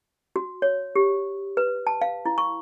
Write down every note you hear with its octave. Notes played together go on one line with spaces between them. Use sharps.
F#4
C#5
G4
B4
A5
F5
E4
C#6